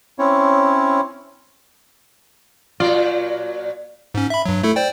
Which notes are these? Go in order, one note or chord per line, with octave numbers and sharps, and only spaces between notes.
C4 C#4 E4 C#5
A#2 F#3 F4 D5
G#2 C#4
E5 B5
G2 F#3
A3 E4 A4
C5 D5 G5